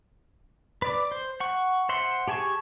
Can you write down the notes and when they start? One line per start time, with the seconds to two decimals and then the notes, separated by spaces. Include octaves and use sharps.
0.82 B4 D5 D6
1.12 C5
1.40 F#5 C#6
1.89 C5 E5 F#5 C6
2.28 G4 G#4 G#5 A5 C#6